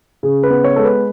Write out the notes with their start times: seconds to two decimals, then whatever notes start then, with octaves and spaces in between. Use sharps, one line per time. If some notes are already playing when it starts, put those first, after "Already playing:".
0.23 C#3 G#4
0.43 B4
0.50 B3
0.64 C#5
0.76 G#3 A4
0.85 B4